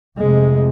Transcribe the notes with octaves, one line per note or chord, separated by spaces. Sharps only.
F1 F2 C3 G#3